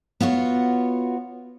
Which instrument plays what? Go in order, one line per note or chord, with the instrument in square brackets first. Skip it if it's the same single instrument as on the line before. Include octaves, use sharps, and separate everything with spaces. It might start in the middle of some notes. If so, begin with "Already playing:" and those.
[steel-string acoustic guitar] B3 F4 F#4 C#5